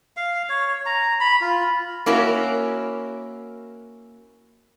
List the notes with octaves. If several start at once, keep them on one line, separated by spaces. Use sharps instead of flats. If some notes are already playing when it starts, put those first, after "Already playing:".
F5
C#5
A#5
B5
F4
A#3 C#4 E4 F#4 A#4